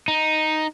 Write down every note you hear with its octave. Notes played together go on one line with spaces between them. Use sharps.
D#4